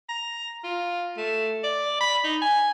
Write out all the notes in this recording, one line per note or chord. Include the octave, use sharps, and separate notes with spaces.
A#5
F4
A3
D5
B5
D#4
G#5